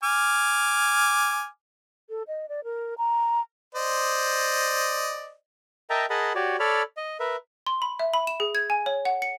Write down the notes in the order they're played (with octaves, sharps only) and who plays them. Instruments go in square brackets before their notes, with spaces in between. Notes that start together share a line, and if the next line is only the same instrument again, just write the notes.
[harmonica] G#5 D6 F6
[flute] A4
D#5
D5
A#4
A#5
[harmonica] C5 D5 D#5
[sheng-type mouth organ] A#4 D#5 E5 G5 A5 A#5
G#4 A#4 D#5 F#5 A5 B5
F#4 G4 C#5 D5
A4 C#5 D5 B5 F6
D#5
A#4 B4 E5
[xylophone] C6
B5
E5
B5
E7
G#4
G#6
G#5
C#5
F#5
C#7